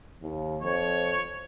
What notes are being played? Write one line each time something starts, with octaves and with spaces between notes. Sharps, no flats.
D#2
F2 C#5